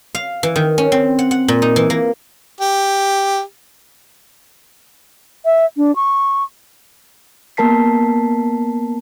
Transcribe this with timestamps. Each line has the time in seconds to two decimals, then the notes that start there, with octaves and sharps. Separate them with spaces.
0.15 F5
0.43 E3
0.56 D#3
0.78 C#4
0.92 C4
1.19 F#5
1.31 F#5
1.48 A#2
1.62 D#4
1.76 E3
1.90 A#3
2.61 G4
5.45 E5
5.77 D4
5.96 C#6
7.57 A#3 B3 A#4 A5 B6 C7